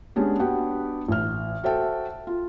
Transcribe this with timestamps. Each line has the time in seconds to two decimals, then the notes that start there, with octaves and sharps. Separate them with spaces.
0.16 G#3 B3 C#4 D4 G4
0.39 B3 D4 F#4 G4 F#5 G5
1.08 A1 F6
1.63 F#4 A4 C5 E5 G5 A5
2.27 F4